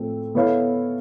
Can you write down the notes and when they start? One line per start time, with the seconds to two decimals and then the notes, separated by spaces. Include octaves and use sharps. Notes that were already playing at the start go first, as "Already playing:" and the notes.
Already playing: A2 F3 A3 C4
0.35 B3 E4 A4 C#5 F5